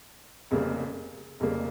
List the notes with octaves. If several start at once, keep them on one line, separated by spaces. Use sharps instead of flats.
F1 F2 C#3 G3 A#3
F1 F2 C#3 G3 A#3